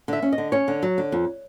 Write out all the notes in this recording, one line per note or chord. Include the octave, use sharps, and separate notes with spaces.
D3 E5
C#4
D#5
D3
C#4 C#5
D3
F#3
D3
F2